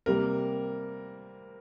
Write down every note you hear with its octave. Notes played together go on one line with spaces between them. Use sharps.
C3 G3 A#3 A#4